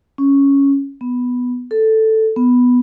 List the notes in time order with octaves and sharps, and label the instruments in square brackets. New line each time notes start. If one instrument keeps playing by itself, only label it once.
[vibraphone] C#4
B3
A4
B3